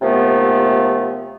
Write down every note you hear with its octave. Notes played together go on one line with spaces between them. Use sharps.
D#2 C3 F3 A3 B3